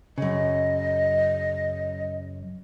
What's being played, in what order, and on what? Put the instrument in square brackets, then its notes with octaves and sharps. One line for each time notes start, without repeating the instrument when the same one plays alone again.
[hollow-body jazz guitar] F#2 C#3 [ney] D#5